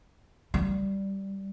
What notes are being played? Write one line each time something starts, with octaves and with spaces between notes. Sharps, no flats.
G3